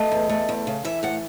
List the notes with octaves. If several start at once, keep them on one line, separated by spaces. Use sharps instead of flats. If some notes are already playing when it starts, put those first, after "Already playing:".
Already playing: A3 D#5
E2
A3
E2
C#3
E3 E5
A2 F#5